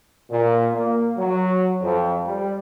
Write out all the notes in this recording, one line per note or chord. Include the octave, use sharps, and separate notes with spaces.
A#2
A#3
F#3
F2
G3